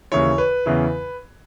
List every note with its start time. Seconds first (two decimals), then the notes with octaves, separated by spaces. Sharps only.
0.12 D#2 C#3 E3 C#5
0.38 B4
0.66 E2 C#3 E3